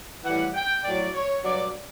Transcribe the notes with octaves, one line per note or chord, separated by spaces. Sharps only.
A2 E3 G3 F#5
G5
A2 F#3 D5
C#5
G2 F#3 D5